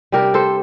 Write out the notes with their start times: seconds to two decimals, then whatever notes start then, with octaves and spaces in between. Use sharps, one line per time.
0.12 C3 G3 D4 G4 A#4
0.34 A4 C5